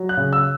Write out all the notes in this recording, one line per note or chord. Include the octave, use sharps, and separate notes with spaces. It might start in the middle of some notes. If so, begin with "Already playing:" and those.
Already playing: F#3
F#6
C#3
E6